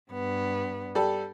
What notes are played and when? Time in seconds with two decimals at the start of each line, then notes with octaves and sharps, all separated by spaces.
0.11 G2 B3
0.95 G3 A4